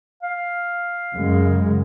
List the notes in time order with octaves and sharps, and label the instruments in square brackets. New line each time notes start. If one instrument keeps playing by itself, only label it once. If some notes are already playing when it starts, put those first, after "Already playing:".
[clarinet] F5
[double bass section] F#2 C#3 G#3